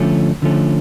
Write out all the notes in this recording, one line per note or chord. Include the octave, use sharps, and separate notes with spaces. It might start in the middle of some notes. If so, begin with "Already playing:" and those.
Already playing: D3 F3 A3 C#4
D3 F3 A3 C#4